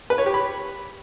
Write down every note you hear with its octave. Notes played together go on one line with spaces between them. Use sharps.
B4
C#5
G4
B5